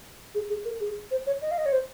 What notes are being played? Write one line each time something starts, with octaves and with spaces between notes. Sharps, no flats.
G#4
G#4
A#4
G#4
C5
C#5
D#5
F5
D#5
C#5
C5